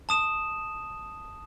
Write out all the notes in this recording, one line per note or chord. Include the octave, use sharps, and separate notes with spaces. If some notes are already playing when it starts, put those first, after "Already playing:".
A5 D#6 E7